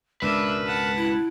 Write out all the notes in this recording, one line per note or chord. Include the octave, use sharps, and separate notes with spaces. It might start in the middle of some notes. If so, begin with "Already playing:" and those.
C#2 G#2 B2 D4 A#4 B4 E5
F#5 A5
E4